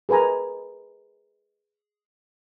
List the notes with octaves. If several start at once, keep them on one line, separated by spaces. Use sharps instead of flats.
G#4 A#4 B4 G#5 A#5